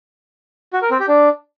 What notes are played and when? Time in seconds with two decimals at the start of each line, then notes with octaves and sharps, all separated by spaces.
0.73 F#4
0.82 A#4
0.91 C4
0.99 G4
1.08 D4